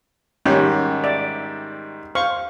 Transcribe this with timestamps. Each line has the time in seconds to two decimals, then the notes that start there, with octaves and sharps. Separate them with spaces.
0.46 G#2 D#3 G3 C#4
1.04 D5 E5
2.15 C5 F5 C#6